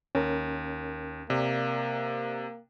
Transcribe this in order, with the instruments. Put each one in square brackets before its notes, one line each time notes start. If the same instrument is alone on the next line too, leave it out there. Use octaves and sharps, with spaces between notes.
[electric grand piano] D#2 [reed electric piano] C#4 A#4
[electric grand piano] C3 [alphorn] A#3 [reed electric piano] D5